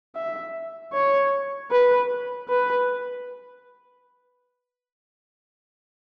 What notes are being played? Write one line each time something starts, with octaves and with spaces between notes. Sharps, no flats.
E5
C#5
B4
B4